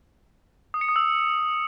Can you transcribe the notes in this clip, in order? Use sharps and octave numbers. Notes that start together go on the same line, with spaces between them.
D#6
C#7
D#6
E6